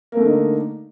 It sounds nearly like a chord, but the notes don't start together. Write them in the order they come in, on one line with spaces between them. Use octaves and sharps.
A#3 A3 D3 D#4